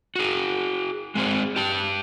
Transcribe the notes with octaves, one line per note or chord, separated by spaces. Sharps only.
F#4 G#4
G#3 C4 G#4 C5
G4 A5